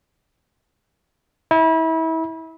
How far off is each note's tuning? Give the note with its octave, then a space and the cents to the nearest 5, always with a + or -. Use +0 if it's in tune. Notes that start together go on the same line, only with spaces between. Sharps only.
E4 -30